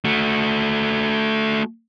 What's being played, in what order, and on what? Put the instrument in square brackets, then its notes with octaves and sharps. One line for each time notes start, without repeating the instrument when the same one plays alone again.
[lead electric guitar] A3 F#4